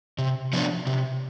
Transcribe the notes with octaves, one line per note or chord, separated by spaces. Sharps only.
C3
F3 B3 D4
C3